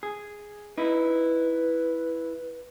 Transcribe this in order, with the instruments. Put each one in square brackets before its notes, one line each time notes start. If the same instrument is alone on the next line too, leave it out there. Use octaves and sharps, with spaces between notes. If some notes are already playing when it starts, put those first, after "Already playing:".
[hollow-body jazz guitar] G#4
[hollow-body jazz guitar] D#4 E4 [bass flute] B4